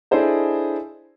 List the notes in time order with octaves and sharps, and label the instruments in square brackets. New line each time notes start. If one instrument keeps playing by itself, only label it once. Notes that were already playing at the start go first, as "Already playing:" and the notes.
[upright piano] D4 E4 G#4 A4 C5 D#5